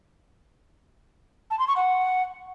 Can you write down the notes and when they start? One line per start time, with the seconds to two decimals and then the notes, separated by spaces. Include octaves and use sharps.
1.51 A5
1.59 C6
1.68 C#6
1.76 F#5